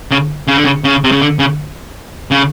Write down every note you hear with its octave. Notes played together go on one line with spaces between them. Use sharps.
C#3
C#3
D3
C#3
C#3
C3
C#3
D3
C#3
C#3